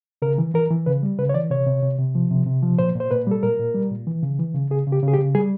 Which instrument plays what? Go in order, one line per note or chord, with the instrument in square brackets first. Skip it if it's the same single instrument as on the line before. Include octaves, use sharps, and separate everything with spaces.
[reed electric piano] C#3 A#4
E3
E3 A#4
E3
C#3 B4
G3
C#3 B4
C#5
E3 D5
C3 C#5
C3
C3
C3
F3
C3
C3
F3
A#2 C5
A#2
C5
A#2 B4
G3 A4
A#2 A#4
A#2
G3
A#2
E3
C#3
E3
C#3
C#3 G#4
C#3
G4
C#3
G#4
G4
C#3
G3 G#4